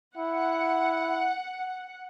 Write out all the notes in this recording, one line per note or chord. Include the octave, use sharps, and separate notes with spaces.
E4 F#5